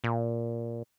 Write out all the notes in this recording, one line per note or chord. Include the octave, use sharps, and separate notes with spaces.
A#2